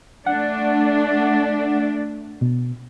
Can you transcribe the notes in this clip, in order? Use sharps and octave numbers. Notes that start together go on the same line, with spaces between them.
A3 D4 F#5
B2